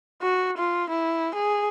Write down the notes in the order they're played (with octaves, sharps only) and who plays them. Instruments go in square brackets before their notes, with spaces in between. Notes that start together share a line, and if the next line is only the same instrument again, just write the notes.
[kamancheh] F#4
F4
E4
G#4